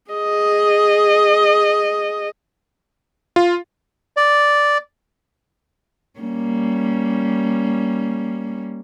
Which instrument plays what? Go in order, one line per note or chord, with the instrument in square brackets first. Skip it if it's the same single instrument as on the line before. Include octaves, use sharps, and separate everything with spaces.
[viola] G#4 D#5
[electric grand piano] F4
[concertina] D5
[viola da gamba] G3 A#3 C#4